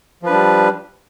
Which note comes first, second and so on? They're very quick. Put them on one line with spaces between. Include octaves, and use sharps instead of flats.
F3 B4 D4 G3